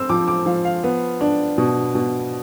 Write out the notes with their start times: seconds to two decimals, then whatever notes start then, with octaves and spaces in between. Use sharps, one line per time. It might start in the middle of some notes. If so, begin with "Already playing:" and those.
Already playing: C4 E6
0.09 F3 D6
0.28 D6
0.46 F3 F5
0.65 F5
0.84 B3
1.21 D4
1.58 B2
1.95 B2